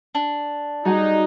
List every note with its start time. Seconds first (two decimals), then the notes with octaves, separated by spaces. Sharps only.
0.15 D4
0.85 G3 D#4 F#4 G#4